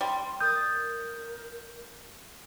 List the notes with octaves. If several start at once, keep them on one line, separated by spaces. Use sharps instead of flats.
G3 C6
A#4 D#6 G6 A6